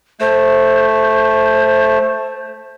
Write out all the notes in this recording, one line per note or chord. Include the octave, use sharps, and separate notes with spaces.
A3 C5